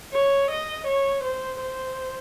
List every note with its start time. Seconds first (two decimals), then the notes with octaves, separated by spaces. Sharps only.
0.13 C#5
0.51 D#5
0.87 C#5
1.24 C5
1.61 C5